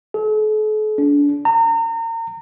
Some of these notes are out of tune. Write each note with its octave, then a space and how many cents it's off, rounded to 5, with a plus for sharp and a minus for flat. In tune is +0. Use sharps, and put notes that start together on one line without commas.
A4 -45
D4 -30
A#5 -35